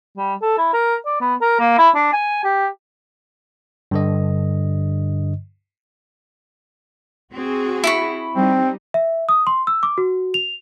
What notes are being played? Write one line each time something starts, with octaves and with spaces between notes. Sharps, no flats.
G3
A4
E4
A#4
D5
B3
A#4
A#3
E4
D4
G#5
G4
G2 D3 D#5
C4 F#4 G#4
E4 B5 C#6
G3 C4 D#4
E5
D#6
C6
E6
D6
F#4
F7